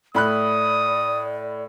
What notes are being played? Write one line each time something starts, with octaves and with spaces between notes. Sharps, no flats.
A2 D5 B5 D#6 F#6